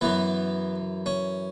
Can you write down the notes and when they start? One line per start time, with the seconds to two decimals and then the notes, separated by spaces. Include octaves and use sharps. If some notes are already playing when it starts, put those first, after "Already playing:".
0.01 F#2 E3 B3
1.06 C#4